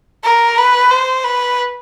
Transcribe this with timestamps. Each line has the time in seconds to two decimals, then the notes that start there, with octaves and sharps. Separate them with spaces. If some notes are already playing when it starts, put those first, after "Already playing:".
0.24 A#4
0.58 B4
0.91 C5
1.24 B4